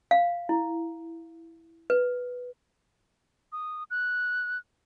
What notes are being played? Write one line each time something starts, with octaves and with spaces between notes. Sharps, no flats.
F5
E4
B4
D#6
F#6